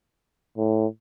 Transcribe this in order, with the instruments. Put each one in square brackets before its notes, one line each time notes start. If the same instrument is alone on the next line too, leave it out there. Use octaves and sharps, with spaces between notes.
[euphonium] A2